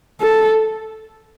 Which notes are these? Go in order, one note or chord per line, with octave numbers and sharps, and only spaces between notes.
A4